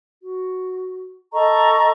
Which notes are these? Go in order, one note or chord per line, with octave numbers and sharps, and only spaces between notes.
F#4
A4 D#5 A#5 C#6